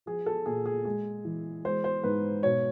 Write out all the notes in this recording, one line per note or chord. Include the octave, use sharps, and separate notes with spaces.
F3 G#4
A4
A#2 G#4
G#4
G#3 G#4
E3
G#3 C5
C5
G#2 B4
B2 C#5